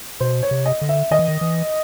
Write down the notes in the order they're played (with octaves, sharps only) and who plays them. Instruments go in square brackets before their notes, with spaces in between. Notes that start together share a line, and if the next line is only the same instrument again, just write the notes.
[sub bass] B2 [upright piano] C5
[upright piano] C#5
[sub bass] C3
[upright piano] D#5
[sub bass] D3
[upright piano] E5
[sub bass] D#3 [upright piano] D#5
[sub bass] E3
D#3
E3